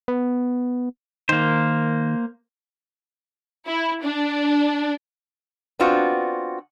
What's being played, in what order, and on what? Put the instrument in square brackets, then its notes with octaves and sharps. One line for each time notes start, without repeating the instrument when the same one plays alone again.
[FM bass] B3
[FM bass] D#3 [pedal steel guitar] A#3 C5
[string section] E4
D4
[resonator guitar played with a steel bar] B3 C4 D4 F4 F#4